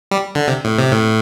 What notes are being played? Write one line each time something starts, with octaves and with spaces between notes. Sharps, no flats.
G3
D3
C3
A2
C3
A2